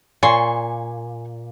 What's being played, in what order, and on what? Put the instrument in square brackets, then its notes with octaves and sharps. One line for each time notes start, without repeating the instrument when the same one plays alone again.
[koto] A#2 [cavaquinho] G#5 C6 C#6